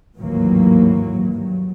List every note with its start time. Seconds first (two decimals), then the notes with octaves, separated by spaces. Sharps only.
0.20 G#1 D#2 A2 E3 F#3 A#3
1.24 G2 F#3